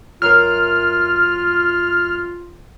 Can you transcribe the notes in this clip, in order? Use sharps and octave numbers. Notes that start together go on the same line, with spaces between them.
F#2 F4 A#4 F6